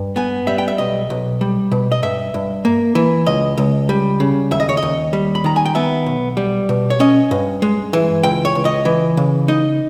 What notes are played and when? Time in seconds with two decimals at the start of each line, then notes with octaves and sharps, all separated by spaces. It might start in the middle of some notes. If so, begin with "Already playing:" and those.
Already playing: G2
0.16 B3 G#5
0.47 G3 E5
0.58 G5
0.68 E5
0.78 B1 D#5
1.10 B1
1.41 G3
1.72 B2
1.92 D#5
2.03 G2 E5
2.34 G2
2.65 A#3
2.95 E3
3.26 C#2 D#5
3.57 C#2
3.89 G3
4.20 C#3
4.51 D#2 E5
4.60 D#5
4.69 C#5
4.77 D#5
4.82 D#2
5.13 G3
5.35 B5
5.44 D#3 A#5
5.56 G#5
5.65 G5
5.75 B3 E5
6.06 B1
6.37 G3
6.69 B2
6.90 C#5
7.00 C#4 D#5
7.31 G2
7.62 G#3
7.93 E3
8.23 C#2 G5
8.45 C#5
8.55 C#2
8.65 D#5
8.85 E3
9.17 C#3
9.48 D#4 D#5